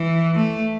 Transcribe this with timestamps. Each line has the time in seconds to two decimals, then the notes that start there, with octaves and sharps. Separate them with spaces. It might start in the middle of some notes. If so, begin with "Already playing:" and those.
Already playing: E3
0.35 A3